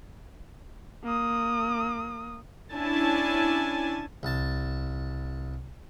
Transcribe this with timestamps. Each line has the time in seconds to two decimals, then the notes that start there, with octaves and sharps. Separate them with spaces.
1.04 A#3 D#6
2.73 C#4 D4 E4 G#5 A5
4.23 C2 A5